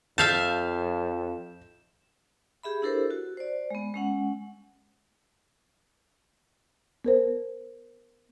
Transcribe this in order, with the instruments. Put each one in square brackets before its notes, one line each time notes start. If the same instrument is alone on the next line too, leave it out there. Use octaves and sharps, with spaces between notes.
[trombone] F2 [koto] E5 F5 A5 [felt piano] G6 [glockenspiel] E7
[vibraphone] G4 G#4 E5 B5
D4 E4 G4 A4 A#4 C5
F#4
C5 D5
G#3 B3
G#3 C#4 F#5
[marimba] B3 A#4 C5